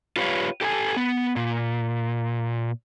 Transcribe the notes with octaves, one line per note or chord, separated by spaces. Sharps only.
F4 G4 B4 C#5 F5
G4 A4 F#5 G#5
B3
A#2